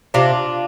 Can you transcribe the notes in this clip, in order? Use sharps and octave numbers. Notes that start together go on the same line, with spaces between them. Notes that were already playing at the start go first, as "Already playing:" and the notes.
C3 D4 F4